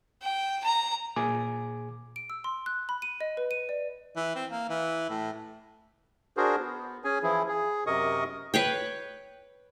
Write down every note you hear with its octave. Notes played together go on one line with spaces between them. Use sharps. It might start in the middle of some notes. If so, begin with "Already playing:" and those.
G5
A#5
A#2 G#4 G#5 D6
D7
E6
C6
F#6
B5
D#7
D#5
B4
D#7
D5
E3
C4
A#3
E3
A2
D4 F#4 G#4 A#4 C5
B3
C#4 G#4 G#5
E3 F3 E4 G#4
G#4
F#2 C3 A#4 D#5 C#6 D#6
B4 C#5 G5